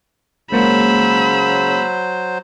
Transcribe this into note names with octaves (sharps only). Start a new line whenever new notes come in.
C#3 F#3 G#3 A#3 C5 B5 E6